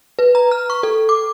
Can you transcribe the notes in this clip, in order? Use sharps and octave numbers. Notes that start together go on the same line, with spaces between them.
B4
A#5
F6
C#6
A4
D6